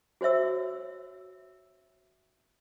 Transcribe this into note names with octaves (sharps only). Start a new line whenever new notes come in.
F#4 C5 C#5 E5 E6